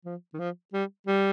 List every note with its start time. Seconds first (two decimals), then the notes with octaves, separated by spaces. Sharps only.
0.05 F3
0.34 D#3
0.39 F3
0.73 G3
1.07 G3